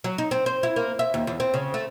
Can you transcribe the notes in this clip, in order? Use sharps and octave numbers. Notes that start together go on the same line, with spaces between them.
F#3
D#4
C4
C5
E4
A#3
E5
D#2
E2
C4
C#3
A3